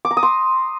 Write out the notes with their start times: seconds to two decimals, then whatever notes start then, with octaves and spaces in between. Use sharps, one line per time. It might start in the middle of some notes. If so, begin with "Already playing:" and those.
0.05 D6
0.11 A#5
0.17 D#6
0.23 C6